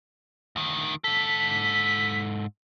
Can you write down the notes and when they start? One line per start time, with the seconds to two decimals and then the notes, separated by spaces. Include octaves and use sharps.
0.56 D2 D#3
1.04 G#2 A4 B6